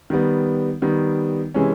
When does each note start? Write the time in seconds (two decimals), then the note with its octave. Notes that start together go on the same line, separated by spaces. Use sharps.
0.10 D#3 G3 B3
0.82 D#3 G3 B3
1.54 C3 E3 G#3 C#4